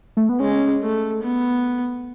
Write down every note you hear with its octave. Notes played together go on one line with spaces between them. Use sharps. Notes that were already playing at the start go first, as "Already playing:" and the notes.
A3
B3
G#3 C#4
A3
B3